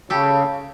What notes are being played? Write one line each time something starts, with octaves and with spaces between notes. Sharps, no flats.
C#3 G4 A4